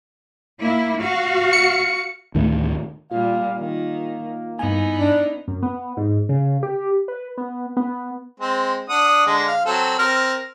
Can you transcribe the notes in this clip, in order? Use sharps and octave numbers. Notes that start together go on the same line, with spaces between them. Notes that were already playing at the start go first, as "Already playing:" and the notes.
A#3 E4
F#4 F5
C#7
D2 A2 D#3 A3
A#2 G3 F4 F5
D#3 A#3
G2 B3 D#4 E4 G#5
D4
F#2
B3
G#2
C#3
G4
B4
B3
B3
G#3 C4
D4 F#5 D#6
D3 G#3
F5
F#3 C4 A4
C4 A#4 F6